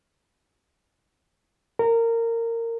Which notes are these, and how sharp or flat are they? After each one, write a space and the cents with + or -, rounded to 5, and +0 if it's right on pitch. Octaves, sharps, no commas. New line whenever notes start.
A#4 -20